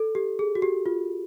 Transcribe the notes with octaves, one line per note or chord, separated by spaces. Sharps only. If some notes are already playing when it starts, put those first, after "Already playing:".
Already playing: A4
G4
G#4
F#4
G4
F4